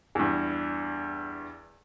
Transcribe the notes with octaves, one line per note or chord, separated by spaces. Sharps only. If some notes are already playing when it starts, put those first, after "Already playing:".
E2 G2